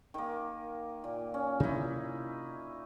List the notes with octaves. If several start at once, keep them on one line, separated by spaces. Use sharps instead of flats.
D#3 A#3
A#2
C#4
C3 C#4 D#4 E4